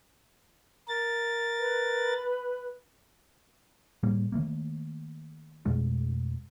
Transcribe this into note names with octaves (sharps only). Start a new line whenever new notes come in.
A#4 A6
B4
A2 G3 A#3
D#3 E3 A3 A#3
F2 B2 G#3 A3